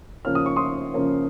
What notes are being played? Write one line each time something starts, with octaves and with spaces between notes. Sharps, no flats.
C#3 F3 A#3 C#4 F6
D#6
C#6
C6 D#6
C#3 F3 A#3 C#4